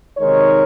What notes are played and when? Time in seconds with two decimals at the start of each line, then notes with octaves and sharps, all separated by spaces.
0.18 C3 D#3 G#3 D#4 A#4 C#5